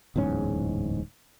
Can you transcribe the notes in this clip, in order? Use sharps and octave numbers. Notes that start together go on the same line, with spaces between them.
D1 E2 G#2 C#4